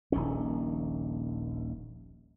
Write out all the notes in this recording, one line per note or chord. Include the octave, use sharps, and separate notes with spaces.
D#1 A#1 D#3 C#4